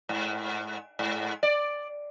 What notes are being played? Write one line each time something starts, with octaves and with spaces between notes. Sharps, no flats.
G#2
G#2
D5